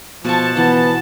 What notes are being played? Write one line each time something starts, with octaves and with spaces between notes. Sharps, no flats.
B2 F3 A5 C#6
E3 B3